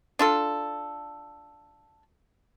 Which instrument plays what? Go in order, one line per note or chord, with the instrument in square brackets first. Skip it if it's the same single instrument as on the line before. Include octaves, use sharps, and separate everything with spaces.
[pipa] D4 F4 A4